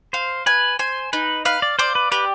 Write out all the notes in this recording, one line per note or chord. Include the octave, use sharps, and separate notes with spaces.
C5 F5
B4 G#5
C5 G#5
D#4 B4
B4 F5
D5
C5 D5
B4
G4 B4